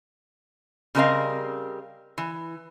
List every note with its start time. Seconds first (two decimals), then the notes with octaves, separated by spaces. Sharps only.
0.95 C#3 G3 C4 A#4 D#5 F5
2.18 E3